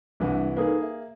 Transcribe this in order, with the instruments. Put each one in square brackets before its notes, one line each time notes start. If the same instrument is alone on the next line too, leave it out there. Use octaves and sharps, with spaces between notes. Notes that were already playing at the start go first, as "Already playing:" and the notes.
[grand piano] C2 E3 F#5 [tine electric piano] G3 D4 E4
[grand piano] A#3 G#4 [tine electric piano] D#4 A4 B4
[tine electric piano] E5